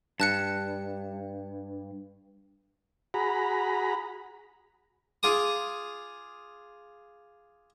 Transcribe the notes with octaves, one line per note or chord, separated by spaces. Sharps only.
G2 A5 F#6 C#7
F#4 G#4 A#5 B5
F4 G#4 D6 D#6